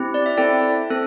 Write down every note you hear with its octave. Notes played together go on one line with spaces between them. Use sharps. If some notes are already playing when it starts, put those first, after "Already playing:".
Already playing: C4 E4 G4
D5
E5
C4 E4 A4 D5 G5
C4 A4